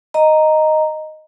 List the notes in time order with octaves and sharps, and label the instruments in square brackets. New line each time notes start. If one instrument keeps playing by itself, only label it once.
[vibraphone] D#5 A#5